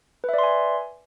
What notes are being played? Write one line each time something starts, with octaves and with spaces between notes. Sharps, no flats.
B4 D5 E5 G#5 C6